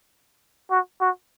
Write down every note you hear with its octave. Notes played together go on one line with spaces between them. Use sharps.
F#4
F#4